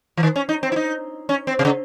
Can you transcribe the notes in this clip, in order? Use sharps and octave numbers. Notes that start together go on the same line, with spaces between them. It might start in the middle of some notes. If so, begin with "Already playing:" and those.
E3
D#3
C#4
D#4
C4
E4
D#4
C#4
C4
C3
C#3